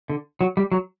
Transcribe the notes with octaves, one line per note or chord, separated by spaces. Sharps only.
D3
F#3
G3
F#3